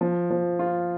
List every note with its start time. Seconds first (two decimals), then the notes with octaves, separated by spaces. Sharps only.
0.01 F3
0.30 F3
0.59 F4